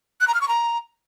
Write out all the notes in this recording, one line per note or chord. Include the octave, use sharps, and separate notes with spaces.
F#6
A#5
F6
C#6
A#5